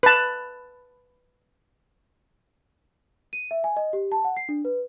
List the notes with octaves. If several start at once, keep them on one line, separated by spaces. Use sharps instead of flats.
B4 A5
D#7
E5
G#5
D#5
G4
A5
F#5
C7
D4
B4